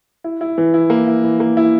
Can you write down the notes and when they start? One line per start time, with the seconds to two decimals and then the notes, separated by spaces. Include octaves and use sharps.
0.24 E4
0.41 E4
0.58 E3
0.74 E4
0.90 A#3
1.08 E4
1.24 E3
1.40 A#3
1.57 E4